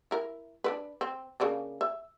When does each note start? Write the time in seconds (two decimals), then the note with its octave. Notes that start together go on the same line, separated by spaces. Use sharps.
0.11 E4 A#4
0.64 D4 E4 B4
1.01 C4
1.40 C#3 A#3 D4
1.81 E5